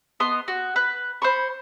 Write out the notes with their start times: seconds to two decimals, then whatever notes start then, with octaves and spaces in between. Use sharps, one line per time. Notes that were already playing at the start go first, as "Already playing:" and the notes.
0.20 B3 D#5 C6
0.48 F#4
0.76 B4
1.22 C5 B5 C#6